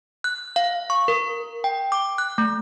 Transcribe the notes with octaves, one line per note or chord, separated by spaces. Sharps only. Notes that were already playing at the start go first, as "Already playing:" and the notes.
F#6
F5
C#6
A#4
G5
D6
F#6
A3